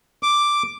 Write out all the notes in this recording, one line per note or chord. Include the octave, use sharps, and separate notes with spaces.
D6